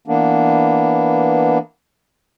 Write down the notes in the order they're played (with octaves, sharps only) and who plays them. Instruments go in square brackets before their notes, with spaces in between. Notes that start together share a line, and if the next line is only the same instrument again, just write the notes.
[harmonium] E3 A#3 B3 D4